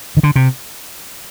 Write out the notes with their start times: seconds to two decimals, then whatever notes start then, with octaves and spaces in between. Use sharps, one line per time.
0.17 D#3
0.23 D3
0.36 C3